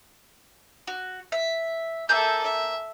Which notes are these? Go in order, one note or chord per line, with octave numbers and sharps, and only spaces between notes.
F#4
E5
A#3 G#4 A4 E5 G6
E5